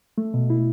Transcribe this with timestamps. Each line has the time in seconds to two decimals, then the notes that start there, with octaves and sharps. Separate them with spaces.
0.18 A3
0.34 B2
0.50 E4